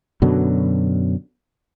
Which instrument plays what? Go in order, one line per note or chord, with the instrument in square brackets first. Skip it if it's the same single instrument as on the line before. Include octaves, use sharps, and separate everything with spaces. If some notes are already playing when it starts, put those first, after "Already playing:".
[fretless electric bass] F#2 B2 D3 F#3